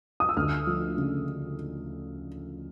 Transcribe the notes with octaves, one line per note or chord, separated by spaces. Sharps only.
D#6
E6
D2 F6
F3
C#3